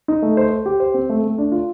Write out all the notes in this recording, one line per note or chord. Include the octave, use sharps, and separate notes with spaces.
D#4
A3
C5
C5
G4
C5
C4
A3
A3
D4
F4